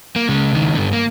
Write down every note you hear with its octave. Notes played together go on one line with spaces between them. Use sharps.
A#3
C#3 G#3
C#2 D#3
G2 D3
A#3